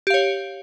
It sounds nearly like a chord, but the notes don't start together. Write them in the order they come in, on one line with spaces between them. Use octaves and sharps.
G4 F5 C#5